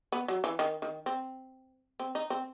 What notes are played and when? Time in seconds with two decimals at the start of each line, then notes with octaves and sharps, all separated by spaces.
0.12 B3
0.28 F#3
0.44 E3
0.59 D#3
0.82 D#3
1.06 C4
2.00 C4
2.15 D#4
2.30 C4